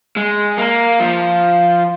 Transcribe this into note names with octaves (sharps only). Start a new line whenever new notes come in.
G#3
A#3
F3